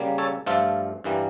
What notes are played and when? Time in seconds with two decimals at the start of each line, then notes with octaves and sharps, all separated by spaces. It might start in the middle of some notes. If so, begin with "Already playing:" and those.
Already playing: C#3 G3 A#3
0.18 A4 C#5
0.46 G2 F3 A3 F4 A4
1.04 G2 E3 G3 A#3